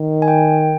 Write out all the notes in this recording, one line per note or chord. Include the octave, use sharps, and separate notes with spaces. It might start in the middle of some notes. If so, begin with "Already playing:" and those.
Already playing: D#3
G#5
G5